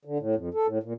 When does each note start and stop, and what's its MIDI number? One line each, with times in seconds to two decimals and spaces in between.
0.05 0.18 50
0.19 0.35 45
0.36 0.49 41
0.54 0.67 69
0.67 0.78 45
0.83 0.93 46